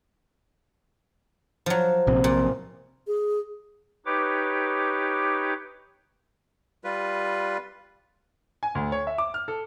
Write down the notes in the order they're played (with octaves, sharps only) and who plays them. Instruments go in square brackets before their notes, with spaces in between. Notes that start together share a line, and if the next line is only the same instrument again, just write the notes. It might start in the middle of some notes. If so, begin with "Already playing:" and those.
[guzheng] F3 F#3
[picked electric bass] A#1 C3
[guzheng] A#2
[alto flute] G#4
[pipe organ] D#4 G4 B4 C#5 D6
[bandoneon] G3 F4 B4
[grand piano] G#5
D2
C#5
E5
D6
F6
A4